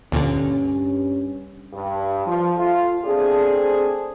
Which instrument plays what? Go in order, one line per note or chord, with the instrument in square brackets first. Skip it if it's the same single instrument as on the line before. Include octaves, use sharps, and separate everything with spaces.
[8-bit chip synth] D2 A#2 D3 [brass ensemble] G2 C#4
[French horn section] G2
F3
A3 F4
A3 C4 D4 G#4